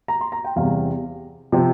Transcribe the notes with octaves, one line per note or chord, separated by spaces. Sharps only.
A#5
C6
A#5
G5
E2 C3 G3 F5
C3 F3 C4